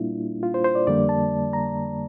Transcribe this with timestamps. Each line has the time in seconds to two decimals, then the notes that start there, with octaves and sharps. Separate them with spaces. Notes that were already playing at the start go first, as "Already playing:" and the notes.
Already playing: A#2 G3 A#3 D4 E4 F4
0.43 F4
0.54 C5
0.64 C5
0.75 D5
0.87 F2 D3 G3 A#3 D5
1.09 A5
1.53 A#5